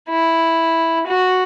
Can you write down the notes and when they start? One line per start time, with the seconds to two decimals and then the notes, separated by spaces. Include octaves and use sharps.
0.09 E4
1.07 F#4